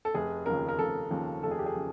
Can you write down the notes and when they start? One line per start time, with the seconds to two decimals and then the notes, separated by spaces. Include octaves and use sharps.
0.05 A4
0.14 F1 G#4
0.46 D#2 C#3 F3 A#4
0.68 A#4
0.78 F1 A4
1.10 D#2 C#3 F3
1.43 F1 A4
1.51 G#4
1.59 G4
1.66 G#4
1.75 C#3 F3